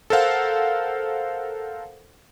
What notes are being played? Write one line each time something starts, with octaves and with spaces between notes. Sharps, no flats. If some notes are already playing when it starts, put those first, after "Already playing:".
A4 A#4 C5 F5 F#5